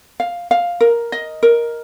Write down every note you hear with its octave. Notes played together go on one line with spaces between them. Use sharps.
F5
F5
A#4
D#5
A#4